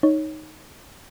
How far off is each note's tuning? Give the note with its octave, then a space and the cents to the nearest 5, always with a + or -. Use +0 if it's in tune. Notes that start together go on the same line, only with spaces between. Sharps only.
D#4 +0 C#5 +0